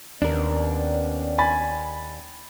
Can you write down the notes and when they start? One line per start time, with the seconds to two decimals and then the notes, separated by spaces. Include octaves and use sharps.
0.22 D#2 B3 C#4 D4 A#4 D5
1.38 G#5 B5 A6